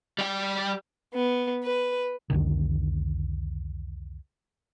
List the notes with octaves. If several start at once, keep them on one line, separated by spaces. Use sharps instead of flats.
G3 G5
B3
B4
C2 F2 D3 D#3